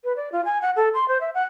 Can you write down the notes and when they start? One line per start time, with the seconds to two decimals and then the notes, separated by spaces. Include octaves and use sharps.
0.04 B4
0.16 D5
0.32 F4
0.45 G#5
0.62 F#5
0.76 A4
0.94 C6
1.08 C5
1.21 E5
1.34 F#5